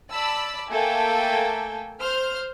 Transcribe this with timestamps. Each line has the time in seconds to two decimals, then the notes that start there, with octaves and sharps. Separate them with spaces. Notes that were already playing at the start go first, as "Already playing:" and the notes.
0.11 D5 A5 B5 E6
0.71 A3 A#3 A4 G5 G#5
2.00 C5 F6